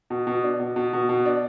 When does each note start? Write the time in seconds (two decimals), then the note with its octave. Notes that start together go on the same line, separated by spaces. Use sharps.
0.10 B2
0.27 B2
0.44 D4
0.60 B2
0.76 B2
0.93 B2
1.09 B2
1.26 D4